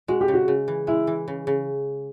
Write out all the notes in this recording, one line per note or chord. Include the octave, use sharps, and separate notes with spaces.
G#3 F#4
G4
C#3
F#4
C#3
E3
G#3 E4
E3
C#3
C#3